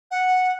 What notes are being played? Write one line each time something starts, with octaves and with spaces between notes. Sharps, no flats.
F#5